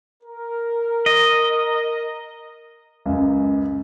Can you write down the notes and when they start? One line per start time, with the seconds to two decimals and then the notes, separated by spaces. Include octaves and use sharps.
0.23 A#4
1.06 D#5
3.06 C#2 F#2